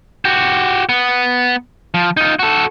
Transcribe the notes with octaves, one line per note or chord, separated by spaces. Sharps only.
F#4 G4
B3
F3
D#4 F4
F#4 A4